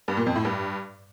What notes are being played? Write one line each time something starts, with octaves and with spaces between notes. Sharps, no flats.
G2
A#2
F2
A2
G2